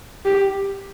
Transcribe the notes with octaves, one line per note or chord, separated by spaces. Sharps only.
G4